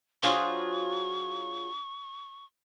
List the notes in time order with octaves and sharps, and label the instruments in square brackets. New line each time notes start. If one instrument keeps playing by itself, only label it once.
[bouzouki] F#3 F4 G#4 [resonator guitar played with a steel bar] D4 C5 F5 [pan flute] C#6